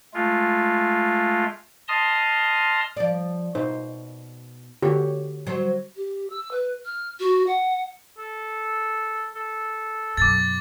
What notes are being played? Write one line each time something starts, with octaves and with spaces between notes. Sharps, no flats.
G#3 A3 F4
D#5 A5 C6 D#6 F6
F3 D5
B2 D#4 C5
D3 F#4 G4 C#5
F#3 C5
G4
E6
B4
F6
F#4
F#5
A4
A4
F#2 B2 D6 A6